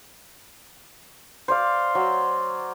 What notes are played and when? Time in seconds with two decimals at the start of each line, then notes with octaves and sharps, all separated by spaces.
1.48 C5 D5 F5
1.95 F#3